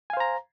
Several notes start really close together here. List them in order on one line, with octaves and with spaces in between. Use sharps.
G#5 F5 C5 A#5